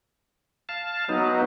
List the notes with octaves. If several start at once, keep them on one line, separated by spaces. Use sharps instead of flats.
F5 A5
F#3 B3 D#4